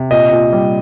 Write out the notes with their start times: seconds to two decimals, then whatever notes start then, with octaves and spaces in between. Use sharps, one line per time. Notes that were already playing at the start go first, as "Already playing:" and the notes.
Already playing: C3
0.11 A#2 D#5
0.32 A#2
0.53 G3